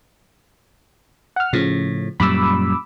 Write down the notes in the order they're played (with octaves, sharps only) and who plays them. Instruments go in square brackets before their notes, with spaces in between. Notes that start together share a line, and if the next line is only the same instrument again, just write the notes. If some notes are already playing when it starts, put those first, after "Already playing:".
[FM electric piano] F#5 F6
[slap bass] A2 [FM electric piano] C#3 F3
[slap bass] F#2 A#2 G3 [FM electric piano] B5 D6 E6